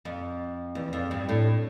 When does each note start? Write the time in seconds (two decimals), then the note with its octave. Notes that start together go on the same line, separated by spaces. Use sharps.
0.05 F2
0.75 E2
0.93 F2
1.11 G2
1.29 A2